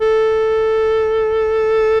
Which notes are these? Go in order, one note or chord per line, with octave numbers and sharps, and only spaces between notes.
A4